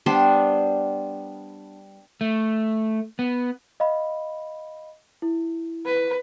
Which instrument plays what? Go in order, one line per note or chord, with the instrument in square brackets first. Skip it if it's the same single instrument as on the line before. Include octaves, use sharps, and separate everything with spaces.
[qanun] G3 B3 D4 C5
[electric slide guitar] A3
B3
[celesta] D#5 F5 B5
E4
[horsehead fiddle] B4